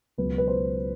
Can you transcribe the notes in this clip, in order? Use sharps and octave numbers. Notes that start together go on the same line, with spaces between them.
C#2 B2 F#3 B4
B4
C5